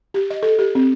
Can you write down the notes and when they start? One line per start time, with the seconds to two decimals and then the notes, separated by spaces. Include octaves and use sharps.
0.14 G4
0.30 D#5
0.43 A4
0.59 G4
0.75 C4